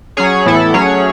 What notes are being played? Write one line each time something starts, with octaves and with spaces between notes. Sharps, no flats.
F#3 C#4 G#4 C#5
A2 E3 B3 E4 A4
F#3 A3 C#4 G#4 C#5